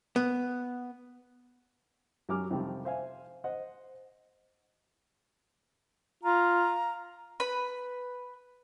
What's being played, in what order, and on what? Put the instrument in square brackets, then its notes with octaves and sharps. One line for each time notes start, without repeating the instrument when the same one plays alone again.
[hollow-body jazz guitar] B3
[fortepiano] F#2 F#3 G4 G#5 D6 F6
F2 C3 D#3 F3 G3
C5 E5 F5 G#5
C5 D#5 F#5
[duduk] F4 [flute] A#5
[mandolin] B4 B5